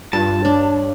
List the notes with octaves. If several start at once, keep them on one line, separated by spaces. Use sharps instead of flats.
G2 F4 A5
D4 C#5